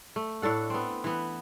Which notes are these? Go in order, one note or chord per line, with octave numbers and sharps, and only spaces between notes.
A3
A2 D4 A4 F#5
B3 C4
E3 B3